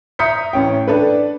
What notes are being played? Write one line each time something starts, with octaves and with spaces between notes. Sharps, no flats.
E5 A#5 D#6 G6 B6 C#7
A1 C#4 G5
D4 A4 B4